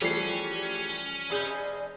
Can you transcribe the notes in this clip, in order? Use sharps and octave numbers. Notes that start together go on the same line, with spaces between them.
E3 F3 G3 A3 C#4 G#4 C7
F1 G#4 D5 G6